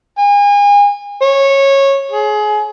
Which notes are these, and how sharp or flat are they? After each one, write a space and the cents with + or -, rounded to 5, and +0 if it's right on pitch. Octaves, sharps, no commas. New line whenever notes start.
G#5 -35
C#5 -15
G#4 +25